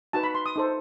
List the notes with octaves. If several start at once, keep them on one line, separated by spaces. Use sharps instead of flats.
D#4 F#4 B4 A5
B5
C6
D#6
D#4 A4 C5